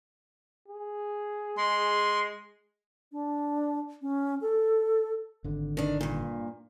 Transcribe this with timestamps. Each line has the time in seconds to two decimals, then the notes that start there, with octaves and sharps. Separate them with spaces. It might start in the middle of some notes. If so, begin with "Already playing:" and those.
0.68 G#4
1.57 G#3 C6
3.12 D4
4.02 C#4
4.41 A4
5.44 G#1 D3
5.77 D#3 D4
6.01 G2 A#2